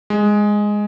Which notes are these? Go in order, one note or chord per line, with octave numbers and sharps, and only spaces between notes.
G#3